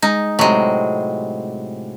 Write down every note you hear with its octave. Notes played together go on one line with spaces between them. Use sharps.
G#3 D#4
A2 C3 F#3 G#3